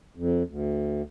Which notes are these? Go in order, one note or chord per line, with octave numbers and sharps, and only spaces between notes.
F2
D2